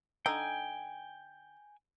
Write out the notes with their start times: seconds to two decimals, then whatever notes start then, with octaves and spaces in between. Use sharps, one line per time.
0.26 D3 D#4 G5 G#5